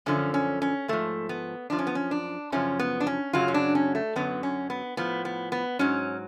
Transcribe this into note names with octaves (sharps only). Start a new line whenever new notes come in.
F#2 D3 F3 C#4
C#4
C#4
G#2 F3 A3
B3
F#2 F3 D4
C#4
B3
C#4
D4
F#2 C#3 F3 C#4
B3
D4
C#4
F#2 C#3 F#3 F4
C#4
D4
C#4
A3
F#2 D3 F#3 B3
C#4
B3
A2 F3 B3
B3
B3
G#2 F#3 C#4